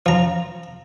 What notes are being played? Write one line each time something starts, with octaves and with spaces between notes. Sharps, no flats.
F3 A#5